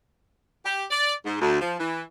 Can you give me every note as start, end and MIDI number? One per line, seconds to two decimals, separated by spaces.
0.65 0.85 67
0.91 1.13 74
1.25 1.39 44
1.41 1.59 38
1.61 1.75 53
1.80 2.02 52